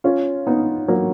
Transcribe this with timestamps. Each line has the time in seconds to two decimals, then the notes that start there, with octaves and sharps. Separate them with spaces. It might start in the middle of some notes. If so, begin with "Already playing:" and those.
0.04 C#4 F4
0.47 B3 D#4
0.88 F#3 A#3